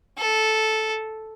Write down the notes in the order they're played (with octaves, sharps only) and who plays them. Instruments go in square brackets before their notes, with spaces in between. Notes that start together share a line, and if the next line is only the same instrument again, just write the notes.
[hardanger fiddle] A4